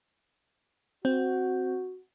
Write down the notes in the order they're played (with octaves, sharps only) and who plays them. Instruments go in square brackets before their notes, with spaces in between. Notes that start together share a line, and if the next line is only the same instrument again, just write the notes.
[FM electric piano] C4 [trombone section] F#4